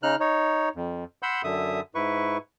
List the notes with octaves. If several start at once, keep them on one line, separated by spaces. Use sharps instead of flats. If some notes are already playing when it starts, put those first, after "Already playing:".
C#3 D#4 F6 F#6
D#4 C#5
F2
F#5 B5 C6 E6 G6
F#2 D3 E5 D#6
G#2 E4 B4 C#6